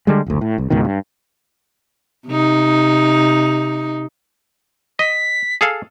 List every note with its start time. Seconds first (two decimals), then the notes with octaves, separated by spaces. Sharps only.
0.07 D3 G3 G#3
0.26 F#1 D2
0.41 A2
0.58 C2
0.70 C#2 G#2 B2 D#3
0.85 G2
2.27 C3 D#4
4.99 D#5 B6
5.61 G#4 A4 F5